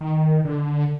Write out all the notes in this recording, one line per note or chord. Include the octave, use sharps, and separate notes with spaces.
D#3
D3